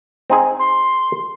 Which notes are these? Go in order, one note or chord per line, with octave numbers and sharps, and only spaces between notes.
C4 D#4 G#4
C6